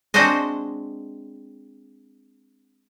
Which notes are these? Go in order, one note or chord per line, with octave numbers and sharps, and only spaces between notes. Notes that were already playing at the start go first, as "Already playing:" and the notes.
G#3 C4 D4 F#4 C5 D#5